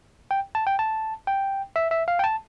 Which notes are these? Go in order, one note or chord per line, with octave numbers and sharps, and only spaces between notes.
G5
A5
G5
A5
G5
E5
E5
F5
G5
A5